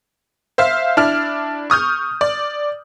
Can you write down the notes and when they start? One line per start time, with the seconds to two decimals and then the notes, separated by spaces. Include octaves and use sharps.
0.58 C5 E5 F5
0.97 D4 E4 F6
1.70 C#6 D#6 F6 G6
2.21 D5